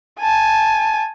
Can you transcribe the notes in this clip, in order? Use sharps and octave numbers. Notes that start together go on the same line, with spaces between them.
G#5 A5